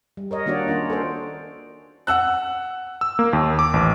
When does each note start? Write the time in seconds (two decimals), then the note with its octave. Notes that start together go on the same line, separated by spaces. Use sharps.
0.17 G3
0.31 A#4 C#5 D#5
0.46 D#3 A#3 D4 F#4 C#5 D5
0.68 A#3 C#4 D4 F4
0.90 A4 A#4 C5
2.07 F#5 E6 F#6
3.01 E6
3.19 A#3
3.33 D#2
3.59 D6
3.74 A1